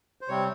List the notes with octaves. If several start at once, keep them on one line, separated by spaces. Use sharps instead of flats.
C5
C3 G3 C4 C#5